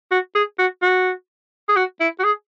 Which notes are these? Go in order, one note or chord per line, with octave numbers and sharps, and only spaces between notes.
F#4
G#4
F#4
F#4
G#4
F#4
E4
F#4
G#4